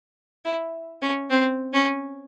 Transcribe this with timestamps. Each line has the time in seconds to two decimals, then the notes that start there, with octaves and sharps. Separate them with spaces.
0.45 E4
1.02 C#4
1.30 C4
1.73 C#4